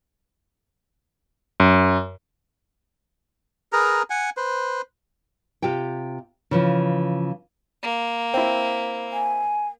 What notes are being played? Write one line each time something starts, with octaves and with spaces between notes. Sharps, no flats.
F#2
G#4 A#4 B4 A#5
F#5 G#5
B4 C5
C3 F4 G4 G5
C#3 E3 F3
A#3
C4 E4
G#5